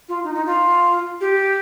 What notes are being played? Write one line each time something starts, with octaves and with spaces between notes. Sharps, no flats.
F4
D#4
D#4
F4
G4